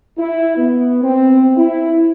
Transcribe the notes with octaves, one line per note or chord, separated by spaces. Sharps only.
E4
B3
C4
E4